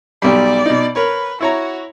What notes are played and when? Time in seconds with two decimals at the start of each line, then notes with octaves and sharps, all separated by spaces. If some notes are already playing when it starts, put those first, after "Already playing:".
0.22 B1 G3 D5
0.66 B2 D#4
0.96 A#4 B4 C#5
1.41 E4 F#4 C#5 A#5